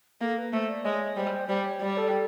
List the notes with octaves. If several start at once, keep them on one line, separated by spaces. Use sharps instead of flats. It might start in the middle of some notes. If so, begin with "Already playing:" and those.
A#3 A4
B4
A3 C5
D5
G#3 C#5
G3 C5
G3 C5
C#5
G3 D5
A4